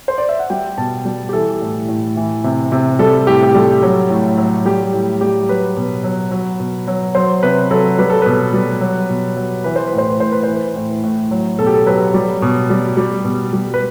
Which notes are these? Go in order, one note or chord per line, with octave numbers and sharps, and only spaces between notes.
C5
D5
E5
F#5
G3 G5
B2 A5
G3
G4
E3 A4
A2
A2
E3
C3
C3
G3 A4
A2 G4
G4
G3 A4
F#3
A2
F#3
G3 G4
A2
G3 G4
F#3 B4
B2
F#3
F#3
B2
F#3
F#3 C5
C3 B4
F#3 A4
G3 B4
A4
B2 B4
G3
F#3
B2
F#3
E3 B4
C5
B4
A2
C5
B4
A2 C5
B4
E3 C5
B4
A2
A2
F#3
B2 A4
G4
A4
F#3 B4
G3
B2
G3
G3
B2
G3
B4